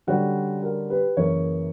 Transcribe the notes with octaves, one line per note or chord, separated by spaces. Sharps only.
D3 G3 C#4 F#4
F#4 A#4
G4 B4
F#2 C#3 E3 A#3 C#4 A#4 C#5